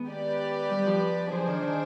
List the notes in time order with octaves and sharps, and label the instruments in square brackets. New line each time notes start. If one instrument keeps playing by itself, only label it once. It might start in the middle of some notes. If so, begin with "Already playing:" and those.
Already playing: [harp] D#3 G#3 B3
[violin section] G4 B4 D5
[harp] G3
F3
[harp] F3 [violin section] D4 G#4 C5
[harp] D#3
D#3